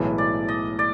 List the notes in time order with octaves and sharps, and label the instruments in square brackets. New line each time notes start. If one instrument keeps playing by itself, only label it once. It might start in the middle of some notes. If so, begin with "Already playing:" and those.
Already playing: [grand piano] B1 A2 E3 G#3
[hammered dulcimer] D5
D#5
D5